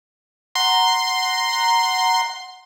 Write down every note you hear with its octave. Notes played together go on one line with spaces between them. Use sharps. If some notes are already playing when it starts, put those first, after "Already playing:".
F#5 A#5 C6